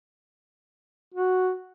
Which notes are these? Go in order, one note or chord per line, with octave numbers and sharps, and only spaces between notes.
F#4